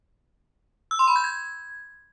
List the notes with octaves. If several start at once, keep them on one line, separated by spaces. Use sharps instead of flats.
E6
C6
B5
G6
G#6